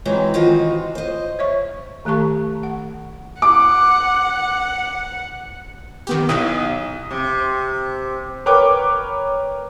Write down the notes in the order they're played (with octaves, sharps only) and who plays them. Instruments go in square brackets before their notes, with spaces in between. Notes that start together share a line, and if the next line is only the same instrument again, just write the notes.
[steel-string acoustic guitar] E3 F#3 G#3 C4 D#4
D#3 E3 F4 F#4 C5 D#5
C5 D#5
[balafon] C#5 E5 C#6
D#3 A3 G4 A5 C#6
F#5
[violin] F#5 [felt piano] D6
[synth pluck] D#3 B3 G4
[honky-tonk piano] B1 [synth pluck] D#4 E4 [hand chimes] D#6
[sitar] C3
[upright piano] A#4 B4 C#5 G5 D6